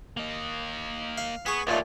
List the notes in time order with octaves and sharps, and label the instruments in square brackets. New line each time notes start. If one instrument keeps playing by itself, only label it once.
[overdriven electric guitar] A#3 D#5
[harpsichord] F5
[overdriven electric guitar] B3 [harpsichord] G#4 C#6
[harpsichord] D#2 A#2 A3 [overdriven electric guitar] G3 F4